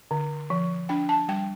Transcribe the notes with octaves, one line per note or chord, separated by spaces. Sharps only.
D3
F3
D4 G5
A5
G3 G5